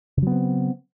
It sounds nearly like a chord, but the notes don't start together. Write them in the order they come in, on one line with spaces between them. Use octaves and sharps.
C#3 F#3 B3 C4